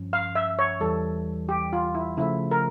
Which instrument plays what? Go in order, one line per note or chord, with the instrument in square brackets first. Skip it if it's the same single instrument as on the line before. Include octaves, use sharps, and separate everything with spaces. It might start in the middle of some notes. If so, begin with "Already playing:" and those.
Already playing: [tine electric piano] G2 F3 C#4
[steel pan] F5
E5
C#5
[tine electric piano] E2 E3 G3 [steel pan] A4
[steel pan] G4
F4
E4
[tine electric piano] C#3 F3 A3 [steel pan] E4
[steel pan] A#4